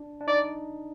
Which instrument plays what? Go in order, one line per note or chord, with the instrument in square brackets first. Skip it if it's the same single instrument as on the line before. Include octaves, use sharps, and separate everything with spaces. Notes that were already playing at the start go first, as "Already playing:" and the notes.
Already playing: [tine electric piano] D4
D4
[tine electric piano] D#4 [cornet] D5